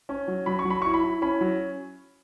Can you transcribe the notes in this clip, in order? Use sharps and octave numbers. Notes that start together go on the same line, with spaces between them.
C#4
F#3
F#3 B5
C#6
F#3
B5
E4 C#6
B5
E4
C#4 B5
F#3